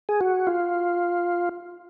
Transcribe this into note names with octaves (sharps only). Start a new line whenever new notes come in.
G#4
F#4
F4